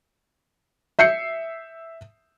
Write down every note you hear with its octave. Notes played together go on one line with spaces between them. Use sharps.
E5 G6 C7 C#7